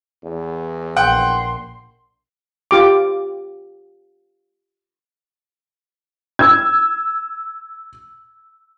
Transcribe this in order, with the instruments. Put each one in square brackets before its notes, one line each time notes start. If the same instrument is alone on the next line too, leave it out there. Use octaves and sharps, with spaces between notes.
[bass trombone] E2
[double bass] A#1 [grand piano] F#5 G5 [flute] C6
[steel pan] F4 G4 D6
[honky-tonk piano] E6 G#6